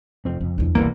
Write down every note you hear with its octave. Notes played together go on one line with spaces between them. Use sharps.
F1 F2 C4
F2 C#3
E2 D4
E1 C2 E3 G3 A#3 B3